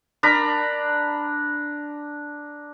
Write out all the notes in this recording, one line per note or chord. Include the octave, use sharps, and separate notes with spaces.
D4 A#4 A#5 B5